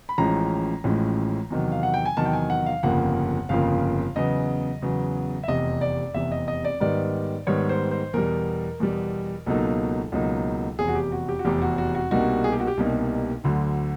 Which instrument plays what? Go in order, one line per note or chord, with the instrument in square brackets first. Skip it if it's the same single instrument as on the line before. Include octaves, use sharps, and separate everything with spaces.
[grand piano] B5
A1 A2 F3 G#3 C#4 A#5
A1 A2 F3 G#3 C#4
E2 C3 D#3 F#3
F5
F#5
G5
G#5
E2 C3 D#3 F#3 A5
G5
G#5
F#5
F5
G1 F2 C#3 F3 A#3 F#5
G1 F2 C#3 F3 A#3 F5
E2 C#3 F#3 B3 D#5
E2 C#3 F#3 B3
E5
F1 E2 C3 D#5
D5
F1 E2 C3 E5
D#5
D#5
D5
G#2 D#3 G3 B3 D5
G#2 D#3 G3 B3 C#5
C5
C5
E2 B2 G3 A#4
E2 B2 G3
C#2 B2 F#3 A#3 D#4 A4
C#2 B2 F#3 A#3 D#4
F1 E2 C3 G#4
F#4
G4
F#4
G4
F#4
F1 E2 C3 G4
F#4
F#4
F#4
C2 B2 G3 A#3 D#4 F#4
G#4
G4
F#4
G4
C2 B2 G3 A#3 D#4
D2 D3 F#3